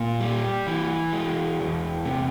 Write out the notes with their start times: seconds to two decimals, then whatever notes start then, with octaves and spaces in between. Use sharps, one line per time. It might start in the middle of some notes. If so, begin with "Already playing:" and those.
Already playing: A#2
0.20 G3
0.67 E3
1.13 G#3
1.60 E2
2.05 C3